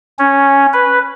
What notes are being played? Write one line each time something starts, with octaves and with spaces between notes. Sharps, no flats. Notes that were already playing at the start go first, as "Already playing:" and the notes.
C#4
B4